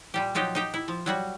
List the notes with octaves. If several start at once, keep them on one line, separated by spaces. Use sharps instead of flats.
A#2 G3 G4
F3 F#3 D#4 G4
D#4 G4 G5
E4
F3
F#3 G3 F#4